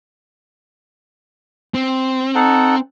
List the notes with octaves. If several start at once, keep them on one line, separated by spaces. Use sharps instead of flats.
C4
D#4 A4 F#5